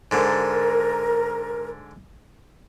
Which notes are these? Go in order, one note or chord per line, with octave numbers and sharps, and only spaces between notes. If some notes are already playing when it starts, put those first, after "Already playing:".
G#2 D3 A#4